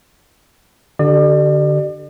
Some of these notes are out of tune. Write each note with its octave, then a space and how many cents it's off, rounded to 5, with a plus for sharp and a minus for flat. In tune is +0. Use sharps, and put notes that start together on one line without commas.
D3 +0 G4 -35 D5 +40